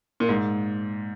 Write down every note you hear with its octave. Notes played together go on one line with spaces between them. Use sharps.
A#2
G#2